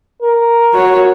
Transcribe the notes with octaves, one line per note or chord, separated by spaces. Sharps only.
A#4
F#4 C#5